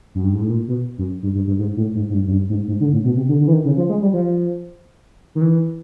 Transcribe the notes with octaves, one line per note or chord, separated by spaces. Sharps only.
F#2
G2
G#2
A2
A#2
B2
F#2
G2
G2
G2
G#2
A2
G#2
G#2
G2
F#2
G2
G#2
G#2
D3
A2
B2
C3
D3
D3
E3
D#3
C#3
F3
G#3
G3
F3
D#3
E3